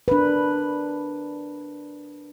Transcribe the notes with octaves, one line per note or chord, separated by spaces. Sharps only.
D4 A#4 B4